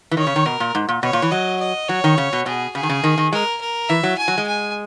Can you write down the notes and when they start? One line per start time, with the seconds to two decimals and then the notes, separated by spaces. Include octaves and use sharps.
0.11 E3
0.17 D#3 C#5
0.27 C#3
0.36 D#3
0.46 B2 A#4
0.60 A#2
0.75 G#2
0.89 A#2
1.03 B2 C#5
1.13 A#2
1.22 E3
1.31 F#3 D#5
1.61 D#5
1.89 F#3 C#5
2.04 D#3
2.18 C#3
2.33 B2
2.46 B2 G#4
2.75 C#3 G#4
2.83 D#3
2.90 C#3
3.04 D#3
3.18 D#3
3.33 G#3 A#4
3.61 A#4
3.89 E3 E5
4.03 F#3
4.18 G#5
4.28 F#3
4.38 G#3
4.48 G#5